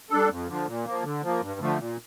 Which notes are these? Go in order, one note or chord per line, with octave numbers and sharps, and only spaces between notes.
G3 D4 A4
F2
D3 F3
A#2
F3 A#3
D3
F3 A#3
G2
D3 F3 A3
A#2